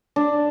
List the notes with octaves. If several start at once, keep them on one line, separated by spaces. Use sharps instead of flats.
D4